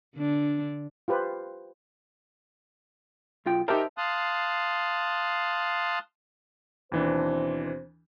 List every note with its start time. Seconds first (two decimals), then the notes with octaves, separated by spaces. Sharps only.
0.16 D3 D4
1.08 F4 G4 B4 C5
3.46 B1 F4 G5
3.68 D#4 G4 A#4 C5 E5 A5
3.98 F5 A5 C6 D#6 F#6
6.92 D#2 B2 E3 C4 D4 C5